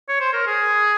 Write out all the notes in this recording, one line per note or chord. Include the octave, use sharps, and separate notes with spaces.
C#5
C5
A#4
G#4